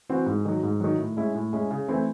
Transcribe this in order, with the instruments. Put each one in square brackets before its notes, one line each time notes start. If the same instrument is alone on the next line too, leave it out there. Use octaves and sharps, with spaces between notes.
[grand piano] E3 C4 F#4
G#2
D#3 F#3
G#2
D#3 F#3
A2
G#3 C#4 E4
A2
G#3 C#4 E4
C#3
E3 A3 C4 E4